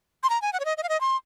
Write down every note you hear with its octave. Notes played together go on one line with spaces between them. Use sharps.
C6
A#5
G#5
F#5
C#5
D#5
D#5
F5
D#5
C6